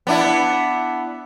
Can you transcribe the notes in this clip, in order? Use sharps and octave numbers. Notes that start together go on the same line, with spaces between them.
B3 D4 E4